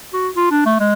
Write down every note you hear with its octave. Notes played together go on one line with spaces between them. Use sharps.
F#4
F4
D4
A3
G#3